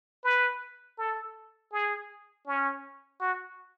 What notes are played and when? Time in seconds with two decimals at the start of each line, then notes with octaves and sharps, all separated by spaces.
0.24 B4
0.98 A4
1.72 G#4
2.47 C#4
3.21 F#4